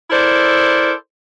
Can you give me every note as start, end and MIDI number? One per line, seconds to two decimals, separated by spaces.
0.11 0.92 64
0.11 0.92 69
0.11 0.92 70
0.11 0.92 72
0.11 0.92 74